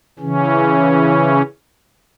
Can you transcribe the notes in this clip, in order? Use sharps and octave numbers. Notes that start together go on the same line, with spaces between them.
C#3 E3 C#4